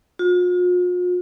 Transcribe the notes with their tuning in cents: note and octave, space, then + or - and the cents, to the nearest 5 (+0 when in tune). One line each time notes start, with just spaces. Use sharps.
F4 +45